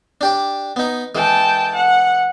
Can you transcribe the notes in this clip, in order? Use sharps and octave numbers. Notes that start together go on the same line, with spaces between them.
D4 G4 D5
B3 D#4
E3 G#3 G5 A5
F#5